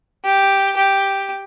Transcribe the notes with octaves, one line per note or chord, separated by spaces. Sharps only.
G4
G4